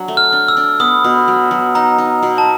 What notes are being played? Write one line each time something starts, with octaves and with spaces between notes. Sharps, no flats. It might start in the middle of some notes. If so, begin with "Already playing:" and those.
Already playing: F#3 D4
A3
F6
D4
E6
D4
B3 D#6
B2
F#3
F#3
D#4 A#5
D#4
B2
A5